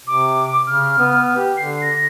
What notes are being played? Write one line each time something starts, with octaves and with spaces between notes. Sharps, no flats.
C3 D6
C#3 F6
B3
G4
D3 C7
A#6